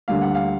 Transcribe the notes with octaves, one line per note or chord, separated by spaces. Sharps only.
D2 D3 G3 A#3 F5
F#5
F5